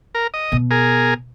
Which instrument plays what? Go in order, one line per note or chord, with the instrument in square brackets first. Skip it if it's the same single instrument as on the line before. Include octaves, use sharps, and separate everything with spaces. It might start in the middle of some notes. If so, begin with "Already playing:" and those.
[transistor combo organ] A#4
D#5
[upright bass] B2
[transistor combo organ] G#4 A#4